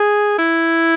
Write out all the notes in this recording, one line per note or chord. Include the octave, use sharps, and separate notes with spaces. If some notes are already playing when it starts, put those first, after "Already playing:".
Already playing: G#4
E4